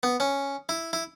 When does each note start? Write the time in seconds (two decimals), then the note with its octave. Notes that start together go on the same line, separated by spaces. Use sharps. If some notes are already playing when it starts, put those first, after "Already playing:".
0.03 B3
0.20 C#4
0.69 E4
0.93 E4